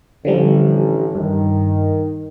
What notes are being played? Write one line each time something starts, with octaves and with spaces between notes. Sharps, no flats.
A1 D3 F3 G3
G2 D#3